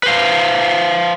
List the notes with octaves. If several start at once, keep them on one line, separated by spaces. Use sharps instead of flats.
B4 C5 F5